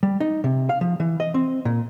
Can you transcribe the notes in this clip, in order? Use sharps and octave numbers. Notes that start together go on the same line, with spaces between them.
G3
D#4
C3
F5
F3
E3
D#5
C4
A#2